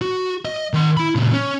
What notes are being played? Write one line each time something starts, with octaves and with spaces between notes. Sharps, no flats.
F#4
D#5
D#3 C6
E4 B5
A#2 C#3
C#4